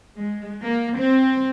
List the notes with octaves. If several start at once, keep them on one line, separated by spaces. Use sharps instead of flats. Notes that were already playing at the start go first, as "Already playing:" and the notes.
G#3
A#3
C4